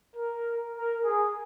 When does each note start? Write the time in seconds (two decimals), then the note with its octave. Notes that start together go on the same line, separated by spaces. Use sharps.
0.15 A#4
0.76 A#4
1.05 G#4